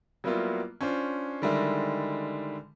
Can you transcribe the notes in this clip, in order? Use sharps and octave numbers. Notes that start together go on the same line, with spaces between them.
F#3 G3 A#3 B3 E4 F4
C#4 D4 F4 C5
D3 D#3 G3 G#3 E4